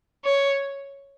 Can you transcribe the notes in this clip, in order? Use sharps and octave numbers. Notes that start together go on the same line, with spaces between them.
C#5